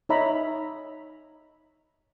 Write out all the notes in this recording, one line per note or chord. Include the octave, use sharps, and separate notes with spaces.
D#4 C#5 D#5 E5 A#5 B5